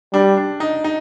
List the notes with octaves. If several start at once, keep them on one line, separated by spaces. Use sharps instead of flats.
G3 D4
D4
D#4
D#4